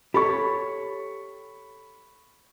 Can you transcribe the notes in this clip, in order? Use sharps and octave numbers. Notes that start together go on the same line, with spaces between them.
G4 A4 C#5 B5 C#6